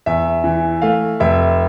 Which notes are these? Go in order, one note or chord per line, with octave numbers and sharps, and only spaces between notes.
E2 E5
E3
A3 F5
F1 E5